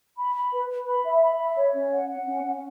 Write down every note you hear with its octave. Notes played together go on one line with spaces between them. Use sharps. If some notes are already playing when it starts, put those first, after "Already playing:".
B5
B5
B4
B4
B5
E5
B5
E5
C#5
C#4
F#5
F#5
C#4
C#4